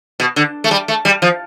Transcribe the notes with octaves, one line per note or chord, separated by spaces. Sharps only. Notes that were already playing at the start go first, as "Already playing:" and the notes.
B2
D3
A3
G3
A3
G3
F3